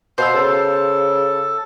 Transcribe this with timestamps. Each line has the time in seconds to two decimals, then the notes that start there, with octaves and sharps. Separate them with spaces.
0.18 B2 C5 F5 E6
0.34 C#3 A4